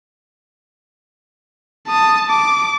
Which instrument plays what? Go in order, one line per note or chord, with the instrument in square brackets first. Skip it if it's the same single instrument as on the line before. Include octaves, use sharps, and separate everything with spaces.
[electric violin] A5 D#6
D6